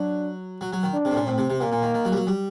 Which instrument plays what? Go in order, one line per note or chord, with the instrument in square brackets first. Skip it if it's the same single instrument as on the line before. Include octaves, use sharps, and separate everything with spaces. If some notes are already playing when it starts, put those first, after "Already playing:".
Already playing: [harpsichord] F#3 [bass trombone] D4
[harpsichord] F#3
F#3
D#3
[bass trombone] D4
[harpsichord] C3
A2
A#2
[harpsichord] A2 [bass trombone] C4
[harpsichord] C3
C3
[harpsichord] A#2 [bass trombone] A#3
[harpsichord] A#2
D#3
D#3
F#3
G3
F#3
G3